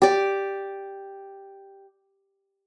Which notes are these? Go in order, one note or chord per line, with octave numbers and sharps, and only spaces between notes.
G4 D5